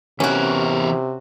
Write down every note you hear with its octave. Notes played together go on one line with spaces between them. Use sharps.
C3 E3 B3 C#4 F#4 A#4